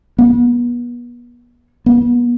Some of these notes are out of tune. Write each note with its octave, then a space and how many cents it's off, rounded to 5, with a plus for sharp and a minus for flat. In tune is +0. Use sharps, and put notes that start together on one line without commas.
B3 -35
B3 -35